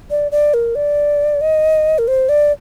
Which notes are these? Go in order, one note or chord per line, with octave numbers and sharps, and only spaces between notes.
D5
D5
A#4
D5
D#5
A#4
C5
D5